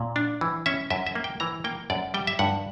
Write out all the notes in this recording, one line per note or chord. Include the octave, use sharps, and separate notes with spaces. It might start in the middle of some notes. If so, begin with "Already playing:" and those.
Already playing: A#2
D4
E3
C#4 E5
F#2 E5
E5
A#3
G5
E3 A#5
A#3 G5
F#2 D5
G3 G5
E5
G2 F#5